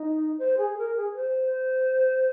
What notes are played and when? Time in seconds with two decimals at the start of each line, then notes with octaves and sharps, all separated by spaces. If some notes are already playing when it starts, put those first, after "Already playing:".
Already playing: D#4
0.39 C5
0.58 G#4
0.78 A#4
0.96 G#4
1.15 C5